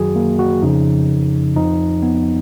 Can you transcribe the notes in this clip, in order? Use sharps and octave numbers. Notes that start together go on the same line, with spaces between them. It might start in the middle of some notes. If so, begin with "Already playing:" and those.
Already playing: F#2 D#3 F#3 F#4 G#4
A#3
F#4
F2 C#3 F3 D#4
F2 F3 D#4
B3